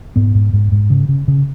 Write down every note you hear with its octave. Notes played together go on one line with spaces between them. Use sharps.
G#2 B3
G#2
G#2
G#2
C#3
C#3
C#3